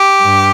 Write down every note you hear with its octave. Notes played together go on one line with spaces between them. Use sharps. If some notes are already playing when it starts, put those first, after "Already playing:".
Already playing: G4
G2